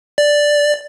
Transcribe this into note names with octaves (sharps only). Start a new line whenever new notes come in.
D5